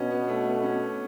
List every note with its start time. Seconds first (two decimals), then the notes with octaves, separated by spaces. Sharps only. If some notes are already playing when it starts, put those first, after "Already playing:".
Already playing: B2 C#4 D4
0.10 B3
0.28 A3
0.46 B3
0.63 C#4